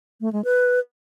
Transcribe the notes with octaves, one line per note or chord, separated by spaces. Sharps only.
A3
G#3
B4